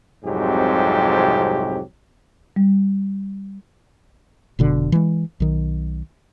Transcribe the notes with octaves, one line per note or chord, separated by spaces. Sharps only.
C2 F2 G#2 C3 F#3 G4
G3
F1 B2 D3
E3 G#3
B1 D#3